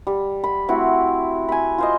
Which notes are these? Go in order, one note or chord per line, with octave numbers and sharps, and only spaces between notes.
G3
B5
A3 C4 E4 F#4
G#5 B5
F4 C5 D#5